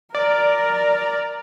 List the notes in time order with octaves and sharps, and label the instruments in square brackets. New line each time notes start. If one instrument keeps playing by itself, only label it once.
[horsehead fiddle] A#4 A#5 [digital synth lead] D5